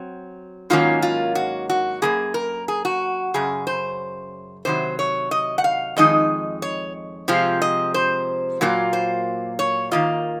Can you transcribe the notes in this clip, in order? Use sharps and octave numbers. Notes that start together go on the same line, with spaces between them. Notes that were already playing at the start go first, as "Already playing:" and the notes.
Already playing: F#3 C4
G#2 D#3 F#3 A#3 C#4 F4
F4
F#4
F#4
F#2 F3 A#3 G#4
A#4
G#4
F#4
F#2 C#3 G#4
C5
C3 D#3 F#3 C5
C#5
D#5
F#5
F5
F2 D#3 G#3 D#4 D#5
C#5
C3 F3 G#3 C4 F4
D#5
C5
A#2 F#3 A#3 F4
C5
C#5
D#3 A#3 F4 D#5